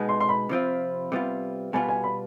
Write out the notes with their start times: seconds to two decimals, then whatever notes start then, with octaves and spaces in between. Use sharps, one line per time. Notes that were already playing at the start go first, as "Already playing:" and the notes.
Already playing: B2 G#3 B3 D#4
0.09 C6
0.20 C6
0.29 B5
0.49 C3 F3 C4 F4
1.12 C3 G3 B3 F4
1.73 B2 G3 B3 F4 G#5
1.89 G#5
2.04 B5